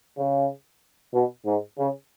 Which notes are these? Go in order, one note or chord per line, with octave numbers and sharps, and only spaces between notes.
C#3
B2
G#2
C#3